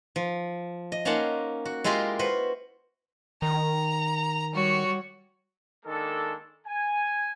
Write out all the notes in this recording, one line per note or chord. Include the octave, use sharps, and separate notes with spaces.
F3
D#5
A#3 C#4 D#4 F#5 A5 C6
F#4
G#3 E4 F4 G4 A#4 C6
F#4 B4 C5
D#3 A#5
G3 F#4 C#5
D#3 G#3 A#3 D4 A4
G#5